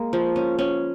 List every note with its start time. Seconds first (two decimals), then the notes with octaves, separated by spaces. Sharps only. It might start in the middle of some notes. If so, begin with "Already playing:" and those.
Already playing: G#3 A#3
0.13 F3
0.36 C#4
0.59 C#4